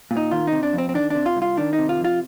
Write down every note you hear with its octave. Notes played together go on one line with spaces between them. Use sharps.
A#2
D#4
D#3 F4
C3 D#4
D4
F2
C4
C4
D#3 D4
C3 D4
F4
C2
F4
D#3 D4
D#4
C3
F4
F2
F4